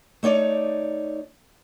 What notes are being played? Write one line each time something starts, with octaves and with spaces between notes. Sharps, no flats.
A3 D#4 C#5 D5